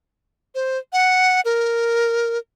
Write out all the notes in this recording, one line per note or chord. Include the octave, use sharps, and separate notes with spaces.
C5
F#5
A#4